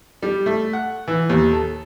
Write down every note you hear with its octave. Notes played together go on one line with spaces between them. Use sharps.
G3
A3
F#5
E3
D#2
A4